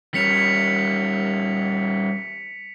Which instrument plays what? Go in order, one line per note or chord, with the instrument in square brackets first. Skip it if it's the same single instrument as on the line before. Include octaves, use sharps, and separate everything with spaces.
[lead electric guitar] G3 C#4 [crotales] B6 C#7 F7